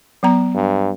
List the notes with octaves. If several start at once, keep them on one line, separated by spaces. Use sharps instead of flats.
F#3 B3 A#5
G2